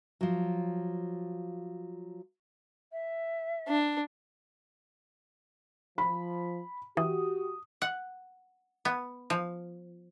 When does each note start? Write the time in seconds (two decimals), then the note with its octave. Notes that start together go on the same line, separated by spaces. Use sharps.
0.21 F3 F#3
2.92 E5
3.68 D4
5.98 F3 B5
6.97 E3 F#4 G4 D#6
7.82 F#5
8.85 B3
9.30 F3